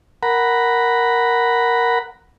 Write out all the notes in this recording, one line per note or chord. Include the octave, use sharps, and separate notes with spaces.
A#4 F#5 A#5 B5